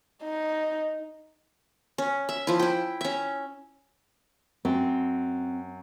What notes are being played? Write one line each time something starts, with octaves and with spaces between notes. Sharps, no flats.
D#4
C#4
E5
F3 E4
E4 G5
C#4 E5
F#2 C4